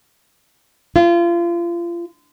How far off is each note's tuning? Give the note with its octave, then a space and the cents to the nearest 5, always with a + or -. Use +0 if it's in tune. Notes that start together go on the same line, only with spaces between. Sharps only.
F4 -30